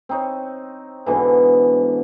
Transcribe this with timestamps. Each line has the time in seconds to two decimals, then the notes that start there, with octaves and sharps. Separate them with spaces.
0.09 C4 D#4 C#5
1.06 G#2 B2 D3 E3